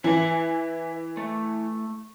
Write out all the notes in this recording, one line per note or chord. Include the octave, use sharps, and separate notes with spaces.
E3 B4 E5 G#5
A3